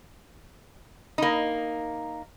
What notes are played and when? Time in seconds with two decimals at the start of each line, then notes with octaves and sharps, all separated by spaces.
1.18 A#3 D#4